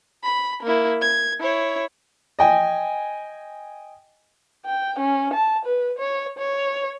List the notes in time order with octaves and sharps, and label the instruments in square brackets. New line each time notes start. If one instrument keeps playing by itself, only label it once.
[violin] B5
A#3 E4
G#6
E4 C#5
[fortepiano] D#5 G5 G#5
[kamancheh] G5
C#4
A5
B4
C#5
C#5